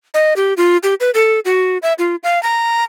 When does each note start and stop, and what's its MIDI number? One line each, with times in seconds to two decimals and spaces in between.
0.14 0.34 75
0.36 0.54 67
0.57 0.77 65
0.83 0.94 67
1.00 1.11 71
1.14 1.40 69
1.45 1.78 66
1.83 1.93 76
1.99 2.16 65
2.23 2.41 77
2.43 2.84 82